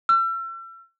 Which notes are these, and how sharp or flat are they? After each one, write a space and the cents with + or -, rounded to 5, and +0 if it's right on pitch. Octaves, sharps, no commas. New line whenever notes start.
E6 +40